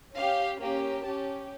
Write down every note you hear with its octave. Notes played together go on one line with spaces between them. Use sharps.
C#4 G4 F5
A#3 C#4 G4
C#4 G4 A5